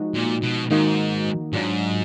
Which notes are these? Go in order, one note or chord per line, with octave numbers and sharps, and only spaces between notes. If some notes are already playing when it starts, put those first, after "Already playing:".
Already playing: F3 G#3 D#4 F#4
A#2
B2
G#2 D#3 A#3 D#4 F#4
G#2 F#3 D4 F4